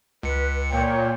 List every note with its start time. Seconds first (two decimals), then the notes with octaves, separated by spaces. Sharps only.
0.23 C#2 B4 C#7
0.71 A#2 C#5 G5